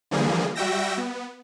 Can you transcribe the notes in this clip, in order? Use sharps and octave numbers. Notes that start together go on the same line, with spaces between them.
D3 E3 F3 G3 A#3 G#4
G3 F#4 E5 G5 E6 A#6
B3